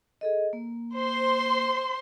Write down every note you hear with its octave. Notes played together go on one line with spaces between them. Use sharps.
G#4 A4 D#5
A#3
C5 C6